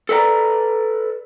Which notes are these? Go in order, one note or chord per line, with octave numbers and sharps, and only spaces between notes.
A4 B4 D5 F5 A#5